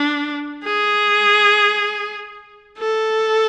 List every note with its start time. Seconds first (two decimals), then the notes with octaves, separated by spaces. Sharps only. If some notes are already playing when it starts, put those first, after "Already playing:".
Already playing: D4
0.64 G#4
2.79 A4